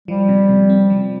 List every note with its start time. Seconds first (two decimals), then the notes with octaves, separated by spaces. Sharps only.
0.08 F3 G3
0.29 C3
0.49 C3
0.70 C4
0.90 F3